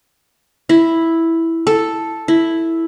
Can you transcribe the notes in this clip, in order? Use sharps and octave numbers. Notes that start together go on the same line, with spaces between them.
E4
A4
E4